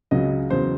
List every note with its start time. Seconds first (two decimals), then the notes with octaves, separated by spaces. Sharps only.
0.11 C#2 C#3 F#3 D#5
0.50 E2 C#3 F#3 C5